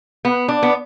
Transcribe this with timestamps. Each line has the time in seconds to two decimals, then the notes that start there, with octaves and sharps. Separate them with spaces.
0.25 B3
0.48 D4
0.63 B3